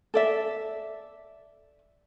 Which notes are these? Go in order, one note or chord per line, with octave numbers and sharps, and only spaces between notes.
A4 D5 E5